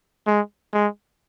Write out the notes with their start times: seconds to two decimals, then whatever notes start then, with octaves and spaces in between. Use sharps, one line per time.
0.27 G#3
0.73 G#3